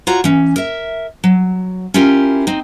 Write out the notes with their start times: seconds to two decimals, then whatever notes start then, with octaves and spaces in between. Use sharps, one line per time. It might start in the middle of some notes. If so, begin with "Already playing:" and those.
0.07 F4 F#4 C#5 A#5
0.24 E3 C#4
0.56 A#4 E5
1.24 F#3
1.94 C#4 E4 F4 G4 A#4
2.47 C4 D#4